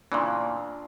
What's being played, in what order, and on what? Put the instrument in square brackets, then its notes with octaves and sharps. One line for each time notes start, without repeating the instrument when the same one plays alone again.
[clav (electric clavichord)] A#2 C#3 E3 [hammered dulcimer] D4 F4